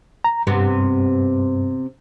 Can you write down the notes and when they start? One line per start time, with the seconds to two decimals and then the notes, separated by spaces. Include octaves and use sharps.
0.24 A#5
0.47 G2 C3 B3